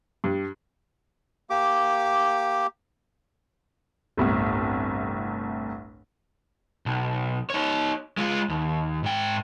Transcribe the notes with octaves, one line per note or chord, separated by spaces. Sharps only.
G2
A#3 G4 D6
G1 C2 A2
B1
D#4 C#5
G#3 F4
D#2
G#2 G5